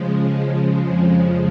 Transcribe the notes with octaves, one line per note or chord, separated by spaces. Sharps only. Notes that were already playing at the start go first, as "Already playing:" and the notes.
Already playing: C#3 F3 G#3
F2 C#3 F3 G#3